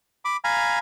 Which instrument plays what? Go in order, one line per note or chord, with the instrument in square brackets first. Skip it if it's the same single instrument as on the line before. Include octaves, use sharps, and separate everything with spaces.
[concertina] B5 D6
F5 G#5 A#5 B5